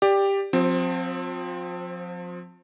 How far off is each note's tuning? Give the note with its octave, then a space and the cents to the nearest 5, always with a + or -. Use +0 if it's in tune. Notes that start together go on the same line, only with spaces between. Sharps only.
G4 +10 D5 +0
F3 +35 C4 +0